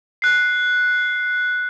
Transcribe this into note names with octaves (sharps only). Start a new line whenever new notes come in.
F#6 C7